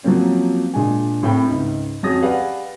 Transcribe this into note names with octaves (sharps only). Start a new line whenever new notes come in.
F3 F#3 A#3 C4 C#4
A#2 G#3 D4 G#5
A2 C4 G5 B5
C#2 G#2
F2 C#4 F#4 G#4 D#6 A#6
G4 G#4 B4 D5 F5 F#5